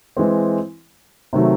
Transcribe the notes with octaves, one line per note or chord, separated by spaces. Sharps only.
E3 G#3 C4
C3 D#3 F#3 A3